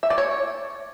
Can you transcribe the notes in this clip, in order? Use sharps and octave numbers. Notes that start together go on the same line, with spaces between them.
E5
D5
C#5